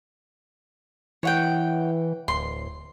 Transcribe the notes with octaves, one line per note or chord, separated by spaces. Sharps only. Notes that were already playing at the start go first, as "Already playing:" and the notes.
E3 C#5 F#5 G5
D1 C6